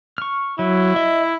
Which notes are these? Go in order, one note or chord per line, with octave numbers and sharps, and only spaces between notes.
C#6 F6
F#3 E4
D#5 E5